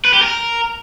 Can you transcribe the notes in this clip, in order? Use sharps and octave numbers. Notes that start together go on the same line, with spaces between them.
B4
G4
A#4